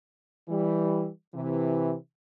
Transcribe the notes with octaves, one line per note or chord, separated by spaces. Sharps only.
E3 G3
C3 E3